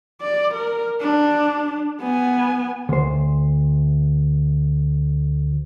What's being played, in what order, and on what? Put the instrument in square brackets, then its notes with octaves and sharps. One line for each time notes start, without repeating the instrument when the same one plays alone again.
[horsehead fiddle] D5
A#4
D4
B3 G#5
[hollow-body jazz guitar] D2 C5